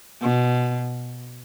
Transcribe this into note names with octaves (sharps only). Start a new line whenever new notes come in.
B2